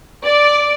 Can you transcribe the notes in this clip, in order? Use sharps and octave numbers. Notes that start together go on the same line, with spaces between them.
D5